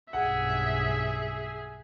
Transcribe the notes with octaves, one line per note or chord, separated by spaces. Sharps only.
B1 G2 G#4 E5 F#5